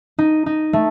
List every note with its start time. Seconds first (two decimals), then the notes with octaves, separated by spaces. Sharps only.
0.19 D#4
0.46 D#4
0.73 A3